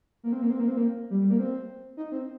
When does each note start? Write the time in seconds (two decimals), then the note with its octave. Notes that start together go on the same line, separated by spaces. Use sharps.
0.23 A#3
0.33 C4
0.42 A#3
0.51 C4
0.60 A#3
0.68 C4
0.77 A#3
1.10 G3
1.21 G3
1.30 A#3
1.39 C4
1.97 D#4
2.12 C4